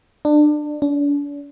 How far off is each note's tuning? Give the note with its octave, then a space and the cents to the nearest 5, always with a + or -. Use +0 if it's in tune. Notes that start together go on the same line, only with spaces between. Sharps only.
D4 +25
D4 -40